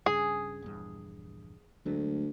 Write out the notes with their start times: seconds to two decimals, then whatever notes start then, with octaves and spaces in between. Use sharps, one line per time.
0.06 G2 C#3 G#4
0.62 A#1 E2 G2
1.86 D2 F#3 G#3 A3